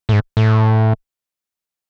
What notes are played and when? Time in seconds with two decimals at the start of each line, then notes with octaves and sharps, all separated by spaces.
0.09 A2
0.12 G#2
0.37 A2